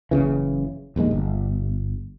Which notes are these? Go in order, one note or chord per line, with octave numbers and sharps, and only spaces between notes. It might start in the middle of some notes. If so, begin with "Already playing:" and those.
F#1 C#2 C#3 E3
D#1 A#1 D#2 G#3
G1